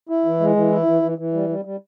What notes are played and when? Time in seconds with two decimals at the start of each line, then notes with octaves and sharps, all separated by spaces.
0.09 E4
0.25 E3
0.40 G#3
0.56 E3
0.71 E4
0.86 E3
1.02 E3
1.18 E3
1.33 G3
1.49 G3
1.65 G3